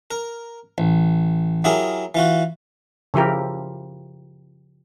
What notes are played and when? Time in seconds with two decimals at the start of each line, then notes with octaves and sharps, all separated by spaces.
0.11 A#4
0.78 A1
1.64 F#3 E4 G4 G#4 A#4
2.15 E3 F4 F#4
3.14 C#3 F3 E4 G4 A#4